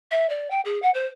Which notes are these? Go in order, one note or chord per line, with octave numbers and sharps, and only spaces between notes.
E5
D5
G5
G#4
F#5
C5